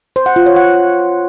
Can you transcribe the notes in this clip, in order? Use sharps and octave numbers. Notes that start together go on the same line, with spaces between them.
C5
F#5
F4
C#5
F#5